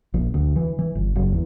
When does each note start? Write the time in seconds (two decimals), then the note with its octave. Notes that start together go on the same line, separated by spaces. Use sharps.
0.14 A#1
0.34 D2
0.56 E3
0.79 E3
0.95 G1
1.16 F#1
1.33 E2